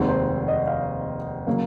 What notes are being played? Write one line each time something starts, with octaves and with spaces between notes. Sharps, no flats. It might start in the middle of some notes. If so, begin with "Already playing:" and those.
Already playing: F1 D#2 D#3 G#3 C4 F#5
C5
D#5
F5
C#3 F#3 A#3